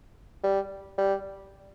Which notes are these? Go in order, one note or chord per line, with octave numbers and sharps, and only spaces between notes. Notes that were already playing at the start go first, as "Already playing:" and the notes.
G3
G3